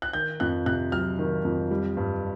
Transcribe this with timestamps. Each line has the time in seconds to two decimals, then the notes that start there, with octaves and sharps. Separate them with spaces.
0.02 F#6
0.13 D#3 G6
0.40 F2 F#6
0.66 C3 F#6
0.92 F#3 F6
1.19 D#3
1.45 F2
1.71 G3
1.97 G2